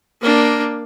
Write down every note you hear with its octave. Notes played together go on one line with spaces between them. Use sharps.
A#3 D4